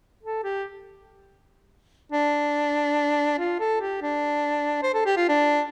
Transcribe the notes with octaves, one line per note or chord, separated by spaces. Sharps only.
A4
G4
D4
F4
A4
G4
D4
C5
A4
G4
F4
D4